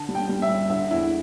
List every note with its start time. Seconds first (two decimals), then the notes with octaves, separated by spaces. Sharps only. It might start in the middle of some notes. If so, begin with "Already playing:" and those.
Already playing: D3 A5
0.09 G3
0.15 G5
0.29 G3
0.42 E5
0.50 G1
0.70 D3 E5
0.91 E2 E4